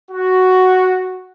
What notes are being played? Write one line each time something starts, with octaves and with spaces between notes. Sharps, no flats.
F#4